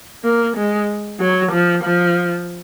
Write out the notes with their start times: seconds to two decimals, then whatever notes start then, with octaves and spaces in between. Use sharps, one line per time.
0.24 A#3
0.56 G#3
1.20 F#3
1.52 F3
1.84 F3